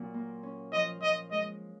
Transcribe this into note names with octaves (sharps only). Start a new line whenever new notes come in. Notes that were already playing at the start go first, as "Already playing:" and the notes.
Already playing: A#2 F#3
A#3
C#4
F3 D#5
F3 D#5
G#3 D#5